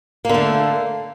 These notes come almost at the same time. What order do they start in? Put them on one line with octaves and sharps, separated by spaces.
A#3 D3 A3